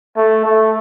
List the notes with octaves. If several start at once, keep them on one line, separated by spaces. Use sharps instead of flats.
A3
A3